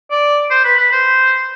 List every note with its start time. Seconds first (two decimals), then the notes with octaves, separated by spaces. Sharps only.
0.11 D5
0.51 C5
0.65 B4
0.78 B4
0.92 C5